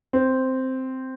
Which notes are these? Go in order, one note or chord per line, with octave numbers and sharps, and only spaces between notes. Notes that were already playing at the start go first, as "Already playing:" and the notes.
C4